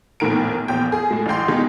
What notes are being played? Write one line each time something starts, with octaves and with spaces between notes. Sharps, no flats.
A#1 E2 A2 D#3 A#4 D7
A#1 E2 G5
G#4
A2 G#3
A1 E3 F5 G5 C6
B2 D3 D#3 G#3 D#4 G4